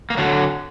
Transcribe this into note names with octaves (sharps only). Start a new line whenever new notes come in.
A#3
D3 F#3 A3